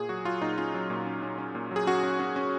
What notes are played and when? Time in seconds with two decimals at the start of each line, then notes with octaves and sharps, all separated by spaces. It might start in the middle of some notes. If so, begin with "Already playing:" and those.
Already playing: A#2 G#4
0.09 F#3 F#4
0.25 F#3 F4
0.42 A#2 D#4
0.58 C#4 F4
0.74 F#3
0.90 A#2
1.06 C#4
1.22 C#4
1.38 C#4
1.55 A#2
1.71 F#3
1.76 G#4
1.87 C#4 F#4
2.03 C#4
2.19 C#4
2.36 C#4